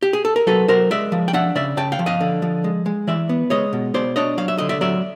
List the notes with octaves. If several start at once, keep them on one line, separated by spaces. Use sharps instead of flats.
G4
G#4
A4
A#4
F#3 A4 B4
F#3 A#4 C5
G#3 D5 E5
F3
G5
D4 E5 F#5
C#3 D5 E5
C#3 G5 A5
F5 G5
F3
D#5 F5
D3
F3
G#3
G#3
E3 D5 E5
B3
G#3 C#5 D#5
B2
B2 C5 D5
D4 C#5 D#5
F#3 F5
E5
D3 D#5
D5 E5
F#3 D5 E5